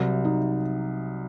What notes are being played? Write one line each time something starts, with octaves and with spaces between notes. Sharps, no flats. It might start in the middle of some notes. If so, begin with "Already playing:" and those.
Already playing: C2 C3 F#3
D#4